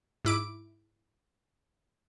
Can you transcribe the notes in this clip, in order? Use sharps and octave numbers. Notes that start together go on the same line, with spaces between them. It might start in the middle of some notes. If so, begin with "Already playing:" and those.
G#2 E4 D6 D7